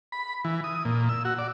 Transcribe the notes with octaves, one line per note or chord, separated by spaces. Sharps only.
B5
E3
D#6
A#2
E6
F#4
D5